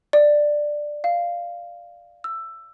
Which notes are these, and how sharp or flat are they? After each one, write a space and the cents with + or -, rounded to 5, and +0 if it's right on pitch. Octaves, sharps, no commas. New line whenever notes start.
D5 +10
F5 -10
E6 +10